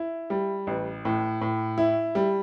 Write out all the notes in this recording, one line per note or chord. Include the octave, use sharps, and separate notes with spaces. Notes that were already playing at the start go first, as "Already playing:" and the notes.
Already playing: E4
G3
A1
A2
A2
E4
G3